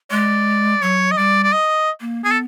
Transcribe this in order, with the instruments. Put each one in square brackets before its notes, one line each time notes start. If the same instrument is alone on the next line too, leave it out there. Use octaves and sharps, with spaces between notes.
[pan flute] G#3 [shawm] D5
[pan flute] F#3 [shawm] C#5
[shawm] D#5
[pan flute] G3 [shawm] D5
[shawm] D5
D#5
[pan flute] A#3
[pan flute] B3 [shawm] G#4
[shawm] A4